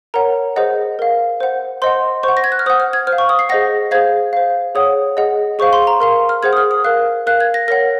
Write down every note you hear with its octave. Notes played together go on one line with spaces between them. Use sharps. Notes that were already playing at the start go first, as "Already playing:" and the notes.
A#4 C#5 F#5 A#5
G#4 C5 D#5 F#5
A#4 F5
C5 F#5
C5 D#5 F#5 C6
C5 F#5 C#6
A#6
G#6
F#6
F6
C5 F#5 D#6
F6
G#6
C5 F6
F5
C#6
D#6
C7
G#4 C5 D#5 F#5 A#6
G#4 C5 F5 G#6
C5 F5
G#4 C#5 F#5 D#6
G#4 D#5 F#5
G#4 C5 F5 C#6
C6
A#5
A#4 F5 C6
F6
G#4 C5 F#5 G#6
D#6
F6
D#6
A#4 F5 F#6
A#4 F5 F#6
G#6
A#6
A#4 C#5 F#5 A#6